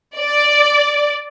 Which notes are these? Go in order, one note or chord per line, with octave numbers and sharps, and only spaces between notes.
D5